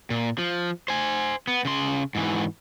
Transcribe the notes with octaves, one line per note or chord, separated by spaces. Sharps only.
A#2
F3
C5 G#5
B3
C#3 C6
G#2 E3